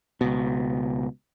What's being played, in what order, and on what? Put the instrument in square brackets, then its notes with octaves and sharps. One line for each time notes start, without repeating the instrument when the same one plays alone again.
[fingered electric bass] C#2 B2